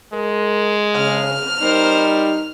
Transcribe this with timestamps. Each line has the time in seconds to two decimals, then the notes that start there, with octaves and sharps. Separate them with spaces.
0.13 G#3 A#4
0.96 C#3 F6
1.62 G3 D#4 A#4 C5